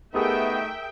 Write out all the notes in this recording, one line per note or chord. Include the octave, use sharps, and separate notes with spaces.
A3 B3 D#4 G4 G#4 A#4 E5 G5